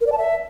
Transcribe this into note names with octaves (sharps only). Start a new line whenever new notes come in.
A#4
D5
A5
E5